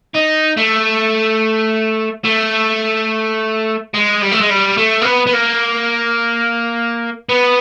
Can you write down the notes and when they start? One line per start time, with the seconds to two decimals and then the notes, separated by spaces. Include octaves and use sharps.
0.15 D#4
0.57 A3
2.25 A3
3.94 G#3
4.22 G3
4.31 A3
4.41 G#3
4.50 G3
4.77 A3
5.01 A#3
5.05 B3
5.27 B3
5.33 A#3
7.29 B3